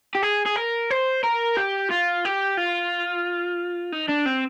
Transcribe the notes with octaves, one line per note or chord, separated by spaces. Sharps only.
G4
G#4
G#4
A#4
C5
A#4
G4
F4
G4
F4
D#4
D4
C4